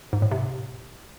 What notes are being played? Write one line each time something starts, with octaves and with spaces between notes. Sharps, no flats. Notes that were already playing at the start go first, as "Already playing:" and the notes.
G#2
A2
C3